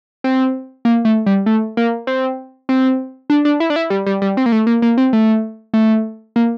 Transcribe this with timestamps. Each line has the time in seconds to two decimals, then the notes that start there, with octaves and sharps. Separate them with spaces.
0.24 C4
0.85 A#3
1.05 A3
1.26 G3
1.46 A3
1.77 A#3
2.07 C4
2.69 C4
3.30 D4
3.45 D4
3.60 E4
3.70 D4
3.76 E4
3.90 G3
4.06 G3
4.22 G3
4.37 C4
4.46 A#3
4.52 A3
4.67 A#3
4.82 A#3
4.97 C4
5.13 A3
5.74 A3
6.36 A#3